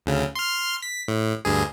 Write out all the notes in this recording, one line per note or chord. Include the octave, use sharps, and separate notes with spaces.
D2 C#3
C6 F6
B6
A2
D2 G2 G#4